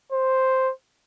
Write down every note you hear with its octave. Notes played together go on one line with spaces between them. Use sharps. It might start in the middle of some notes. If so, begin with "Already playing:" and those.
C5